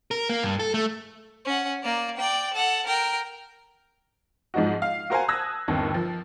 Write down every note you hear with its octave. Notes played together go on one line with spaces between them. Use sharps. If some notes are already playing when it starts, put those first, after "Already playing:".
A#4
A#3
G2
A4
A3
C#4 F#5
A#3 D5
D5 G5
A4 F#5
A#4 G5
G#2 F3 G#3 D#4 F#4
F5
F#4 A#4 C5 F5 F#5 G#5
A5 D#6 E6 F#6 G#6 A#6
G1 D#2 C4 A5
F3